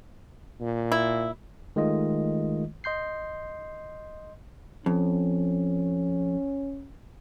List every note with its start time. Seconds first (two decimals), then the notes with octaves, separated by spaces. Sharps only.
0.60 A#2
0.92 E4
1.76 D#3 G#3 A3 F4 D#5
2.84 D#5 C6 G6 C7
4.86 F2 C#4